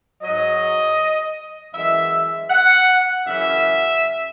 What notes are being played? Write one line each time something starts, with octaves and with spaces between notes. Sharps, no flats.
G#2 F#3 D#5
F#2 E3 G#3 E5
F#5
F#2 C#3 E3 E5